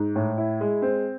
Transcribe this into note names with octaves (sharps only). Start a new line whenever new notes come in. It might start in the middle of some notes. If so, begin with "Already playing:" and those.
Already playing: G#2
A2
E4
G#3
C4